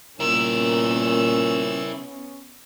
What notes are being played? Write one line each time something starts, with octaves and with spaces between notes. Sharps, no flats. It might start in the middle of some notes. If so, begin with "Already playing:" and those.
A#2 B3 C#4 E4 A#4 E6